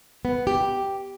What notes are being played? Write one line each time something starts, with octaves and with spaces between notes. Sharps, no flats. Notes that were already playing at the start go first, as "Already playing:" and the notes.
B3
G4